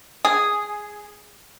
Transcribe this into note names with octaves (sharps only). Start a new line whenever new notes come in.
G#4